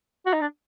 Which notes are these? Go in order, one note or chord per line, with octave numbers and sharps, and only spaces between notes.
F#4
D#4
D4